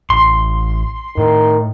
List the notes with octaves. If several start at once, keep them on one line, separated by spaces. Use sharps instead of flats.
A1 C6
A2 D#3